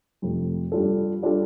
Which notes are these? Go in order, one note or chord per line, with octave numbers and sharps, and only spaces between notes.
F2 C3 F3 A3
G2 G3 D4 F4 A4
G3 D4 F4 A4